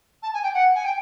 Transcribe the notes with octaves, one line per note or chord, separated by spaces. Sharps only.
A5
G#5
G5
F#5
G#5
G5